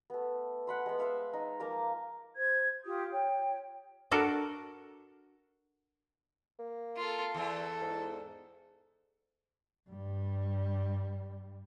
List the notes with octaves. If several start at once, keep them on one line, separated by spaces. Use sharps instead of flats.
A3 B3
F#5 B5 C6
G#3 B3
C5 E5 F5 B5
D#4
F3 A#3 A#5 D6
C5 G#6
F4 G4 D#6
C#5 G5
D4 F#4 A4 A#4
A#3
F4 A4
E2 A4
G#2
G2 G3